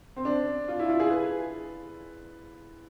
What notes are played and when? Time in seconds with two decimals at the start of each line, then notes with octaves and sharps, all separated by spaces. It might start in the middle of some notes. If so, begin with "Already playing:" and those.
0.16 C4
0.25 D4
0.68 F4
0.79 E4
0.89 F4
1.00 G#4
1.10 B4